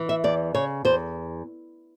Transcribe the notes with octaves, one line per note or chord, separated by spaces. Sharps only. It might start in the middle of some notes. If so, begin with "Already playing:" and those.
Already playing: E3
E5
E2 D5
C#3 C#5
E2 C5